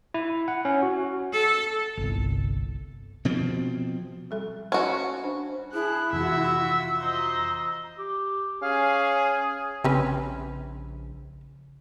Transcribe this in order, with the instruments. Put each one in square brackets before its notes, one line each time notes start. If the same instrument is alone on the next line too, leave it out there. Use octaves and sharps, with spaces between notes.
[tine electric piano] E4
F#5
C#4
F#4
[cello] A4
[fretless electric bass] G1 C2
[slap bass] B2 F3 C4
[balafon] G3 A4 E5
[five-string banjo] C#4 F#4 [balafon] A5 C#6
[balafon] D4 C5
[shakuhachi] E4 [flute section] G#4 A5 D#6 [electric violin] F#6
[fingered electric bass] F2 C3 E3 [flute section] F4 E6 [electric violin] F#4 E5
[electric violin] C5 D#5 [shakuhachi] A#5
[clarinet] G4
[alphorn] C#4 [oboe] G#4 [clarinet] F5
[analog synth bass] A#1 [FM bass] C#3 [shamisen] C4 C#4 B4